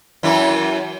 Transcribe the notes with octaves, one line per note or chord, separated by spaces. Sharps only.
F#2 E3 E4